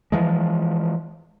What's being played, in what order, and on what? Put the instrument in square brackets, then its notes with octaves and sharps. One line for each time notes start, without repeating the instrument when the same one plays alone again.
[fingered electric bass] E3 F3 G#3